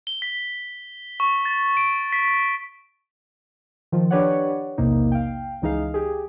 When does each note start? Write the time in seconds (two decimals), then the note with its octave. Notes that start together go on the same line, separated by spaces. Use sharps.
0.07 G7
0.22 B6
1.20 C#6
1.45 A6
1.77 D7
2.13 B6
3.92 D#3 F3 F4
4.11 D4 G4 B4 C#5 D5 F#5
4.78 B1 E2 C3 A#3 D#4
5.12 F5 G5
5.62 C#2 E3 D#4 G#4 F5
5.94 G4 G#4